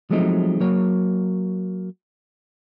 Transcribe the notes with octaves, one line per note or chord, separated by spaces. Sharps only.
F3 F#3 G#3 A3 C4 D#4
F#3 A#3 C#5